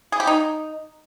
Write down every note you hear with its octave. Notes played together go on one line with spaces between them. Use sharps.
G#4
G4
D#4